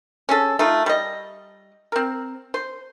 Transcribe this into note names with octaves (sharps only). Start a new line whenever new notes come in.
C#4 G#4 A4
A3 D#4 F4
G3 D#5
C4 A#4
C5